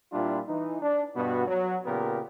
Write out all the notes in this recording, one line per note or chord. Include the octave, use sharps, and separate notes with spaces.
A#2 G3 D4 E4 F4
E3 D#4
D4
G2 B2 B3 F#4
F#3
A#2 C#3 B3 G4 A#4